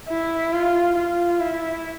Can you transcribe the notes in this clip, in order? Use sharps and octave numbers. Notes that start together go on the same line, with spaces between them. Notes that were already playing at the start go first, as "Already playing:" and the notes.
E4
F4
F4
E4